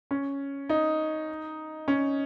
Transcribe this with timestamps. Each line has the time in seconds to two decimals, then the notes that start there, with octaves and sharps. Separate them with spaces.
0.11 C#4
0.69 D#4
1.88 C#4